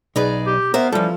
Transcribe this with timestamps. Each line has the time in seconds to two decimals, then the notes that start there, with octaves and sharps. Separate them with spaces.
0.16 B1 D#4 G#4 B4 D5
0.46 G4
0.74 B3 A#4 C5 E5 F5
0.92 E3 F3 G3 C#4 F4 A4